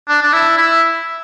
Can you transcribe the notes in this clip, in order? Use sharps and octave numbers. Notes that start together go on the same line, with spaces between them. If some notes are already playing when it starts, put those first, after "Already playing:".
D4
D4
E4
E4